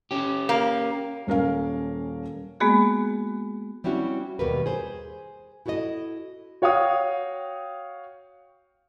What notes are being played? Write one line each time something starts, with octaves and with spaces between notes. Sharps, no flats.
C#4 G4
A#3
D#1 C#4 A#4 F5
G#3 A#3 B3 F#4 G#4
G3 C4 C#4 E4 F#4
D#2 B2 G3 A#4 B4
G#4 C5
E4 F#4 A4 C#5 D#5
F#4 C#5 F5 G5 D#6